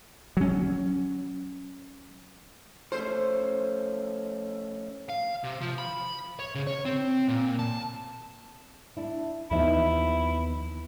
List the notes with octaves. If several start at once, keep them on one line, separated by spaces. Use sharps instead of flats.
F#3 C#4
F3 A3 C#4 C5
F5
C3
F3
B5
C#5
C#3
C#5
C4
A#2
A5
D4 E4
D#2 E3 F3 B3 D#4 E4 E5